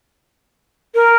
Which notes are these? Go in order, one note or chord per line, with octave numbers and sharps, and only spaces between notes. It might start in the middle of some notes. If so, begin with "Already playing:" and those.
A#4